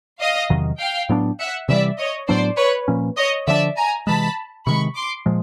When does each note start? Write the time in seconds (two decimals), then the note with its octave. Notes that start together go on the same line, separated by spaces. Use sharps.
0.20 D#5 F5
0.50 E2 C3 D#3 F#3
0.79 F5 G5
1.09 A2 F#3 B3 D4
1.40 E5 F#5
1.68 C3 E3 G3 D5 E5
1.99 C#5 D#5
2.28 A2 F#3 B3 D4 C5 D5
2.58 B4 C#5
2.88 A#2 F3 A#3 C#4
3.18 C#5 D#5
3.47 D3 F3 A3 D4 D5 E5
3.77 G#5 A#5
4.07 C3 E3 G#3 A5 B5
4.66 C3 D#3 G#3 B5 C#6
4.96 C6 D6
5.26 A#2 F3 G#3